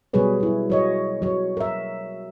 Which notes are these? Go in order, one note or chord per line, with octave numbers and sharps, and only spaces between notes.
B2 F#3 G3 G#4 B4 C#5
B3 E4
F#3 C#5 D#5
F#3 C#5
A#4 E5